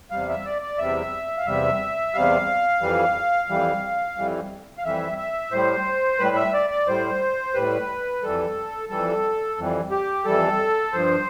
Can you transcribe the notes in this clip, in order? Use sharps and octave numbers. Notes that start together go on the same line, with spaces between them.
E2 C3 G3 F5
E5
D5
D5
E2 C3 G3 E5
F5
E2 C3 G3 E5
E2 C3 G3 F5
F2 E3 G3
F2 E3 G3
F2 E3 G3
F5
F2 E3 G3 E5
E5
A2 G3 C5
A2 G3 B4
E5
D5
D5
A2 G3 C5
A2 G3 B4
F2 E3 G3 A4
F2 E3 G3 A4
F2 E3 G3
G4
F2 E3 G3 A4
G2 F3 C5